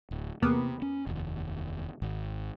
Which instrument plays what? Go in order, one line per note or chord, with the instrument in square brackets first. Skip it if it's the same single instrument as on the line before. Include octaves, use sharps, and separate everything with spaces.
[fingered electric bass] D1
[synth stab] E2 A#3 B3 [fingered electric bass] C3
[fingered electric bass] C#4
F1 D#2
G#1